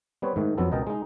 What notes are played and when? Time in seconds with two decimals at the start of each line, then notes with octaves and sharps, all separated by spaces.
0.22 G3 B3 C4 B4 C#5
0.36 G#2 D#3 A3
0.58 F2 F#3 B3 A4
0.71 C#2 B2 A#4 D#5 G5 A5
0.87 G#3 D#4